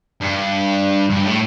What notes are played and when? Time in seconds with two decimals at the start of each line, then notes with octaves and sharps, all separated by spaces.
0.21 G2
1.10 G2
1.24 A2